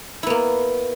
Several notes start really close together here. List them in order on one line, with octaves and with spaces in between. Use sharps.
E4 B3 A#3